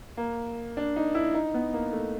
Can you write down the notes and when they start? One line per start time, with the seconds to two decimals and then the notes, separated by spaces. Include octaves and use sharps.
0.17 A#3
0.77 D4
0.96 D#4
1.15 E4
1.34 D#4
1.54 B3
1.73 A#3
1.93 A3